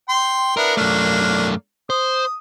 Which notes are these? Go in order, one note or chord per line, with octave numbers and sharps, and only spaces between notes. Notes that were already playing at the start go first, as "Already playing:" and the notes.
G5 C6
B3 D4 E4 A#4
F#2 A3 A#3 D4
C5 D#6